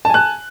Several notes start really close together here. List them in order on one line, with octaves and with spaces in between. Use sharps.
A5 G#5 F#6